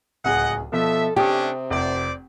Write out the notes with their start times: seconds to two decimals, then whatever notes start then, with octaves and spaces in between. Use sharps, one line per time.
0.24 D1 C#2 G#4 D#5 F#5
0.72 B2 F3 A4 E5 A5
1.16 C3 A3 C#4 D4 G4 G5 D#6
1.70 F1 C5 D5